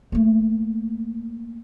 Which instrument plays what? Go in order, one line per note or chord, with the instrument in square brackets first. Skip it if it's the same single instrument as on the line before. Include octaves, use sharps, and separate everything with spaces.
[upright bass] A3 A#3